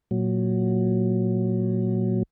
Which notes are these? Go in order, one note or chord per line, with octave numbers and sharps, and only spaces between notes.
A#2 F#3